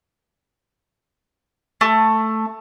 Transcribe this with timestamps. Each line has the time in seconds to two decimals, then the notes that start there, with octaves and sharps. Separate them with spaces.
1.81 A3